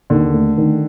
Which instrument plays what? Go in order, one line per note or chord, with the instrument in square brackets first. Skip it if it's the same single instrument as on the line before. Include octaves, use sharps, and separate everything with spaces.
[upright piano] D#2 [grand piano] D3
[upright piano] A3
D#3